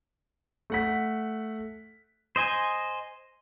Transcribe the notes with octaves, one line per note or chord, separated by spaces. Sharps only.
A3 F#5 B6
C5 D#5 G#5